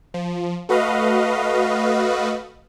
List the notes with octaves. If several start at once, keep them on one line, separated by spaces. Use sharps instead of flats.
F3
A3 F#4 B4 D#5 F5